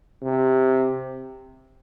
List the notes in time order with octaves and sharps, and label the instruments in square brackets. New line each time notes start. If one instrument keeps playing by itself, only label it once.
[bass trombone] C3